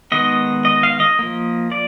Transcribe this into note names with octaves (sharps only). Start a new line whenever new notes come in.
D#3 G#3 B3 D#5
D#5
F5
D#5
F3 A#3
D5